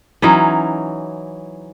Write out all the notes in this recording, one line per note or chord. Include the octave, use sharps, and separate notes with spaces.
E3 F#3 C#4 D#4